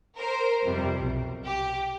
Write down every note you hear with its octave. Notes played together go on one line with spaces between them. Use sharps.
A#4 C5
F2 C3 G3
B1
G4